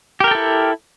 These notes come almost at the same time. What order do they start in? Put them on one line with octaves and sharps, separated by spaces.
G4 A#4 G5 A4 E4